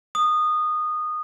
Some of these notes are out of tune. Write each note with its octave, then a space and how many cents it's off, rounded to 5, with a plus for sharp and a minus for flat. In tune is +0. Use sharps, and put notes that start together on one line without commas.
D#6 -20